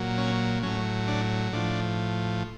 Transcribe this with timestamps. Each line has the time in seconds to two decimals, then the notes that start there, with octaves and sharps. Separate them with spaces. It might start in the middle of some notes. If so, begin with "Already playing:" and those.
Already playing: A#2 F#3
0.18 C#4
0.63 A2 F#3 C#4
1.08 D4
1.53 A2 F3 D4